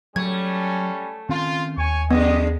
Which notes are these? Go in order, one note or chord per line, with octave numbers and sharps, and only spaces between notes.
F#3 G3 A3 C#4 G#6
D#3 C4 C#4 F4
D#2 C#5 G#5 C#6
F2 D3 G#3 B3 G4 D#5